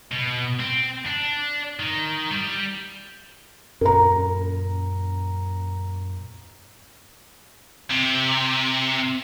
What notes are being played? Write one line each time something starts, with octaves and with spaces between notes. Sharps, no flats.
B2
C4
D4
D#3
G3
F#2 A#2 C#4 A#4 A#5
C3